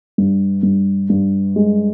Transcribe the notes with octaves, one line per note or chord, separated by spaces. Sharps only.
G2
G2
G2
G#3